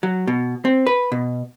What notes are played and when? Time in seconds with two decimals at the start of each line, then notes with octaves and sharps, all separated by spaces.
0.03 F#3
0.27 B2
0.65 C4
0.87 B4
1.12 B2